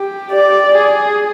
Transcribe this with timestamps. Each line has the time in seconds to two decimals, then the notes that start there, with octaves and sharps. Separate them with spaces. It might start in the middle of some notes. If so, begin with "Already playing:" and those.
Already playing: G4
0.32 D5
0.72 G#4